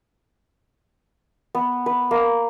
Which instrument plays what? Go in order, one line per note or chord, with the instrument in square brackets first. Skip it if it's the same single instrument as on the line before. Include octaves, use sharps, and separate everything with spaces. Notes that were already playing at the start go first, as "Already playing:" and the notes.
[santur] B3
B4
A#3